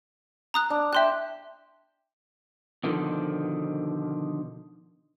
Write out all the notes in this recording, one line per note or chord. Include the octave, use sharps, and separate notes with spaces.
A#5 D#6 F#6
D4
E5 G5 A5 C6 F#6
B2 D3 D#3 F3